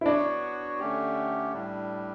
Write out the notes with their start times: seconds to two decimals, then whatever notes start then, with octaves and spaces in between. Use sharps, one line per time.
0.01 E4
0.06 B3 D4 F#4 C#5
0.79 D3 A3 C#4 G4
1.53 A2 G3 D4